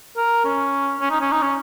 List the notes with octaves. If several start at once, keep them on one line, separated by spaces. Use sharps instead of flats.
A#4
C#4
C#4
D#4
C#4
D#4
C#4